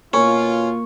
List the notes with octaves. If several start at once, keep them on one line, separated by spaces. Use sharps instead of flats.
B2 A#3 C#4 F4 C#6